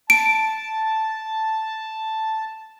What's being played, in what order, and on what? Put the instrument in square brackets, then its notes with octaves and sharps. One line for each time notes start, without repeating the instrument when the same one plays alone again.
[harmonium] A5 [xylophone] D7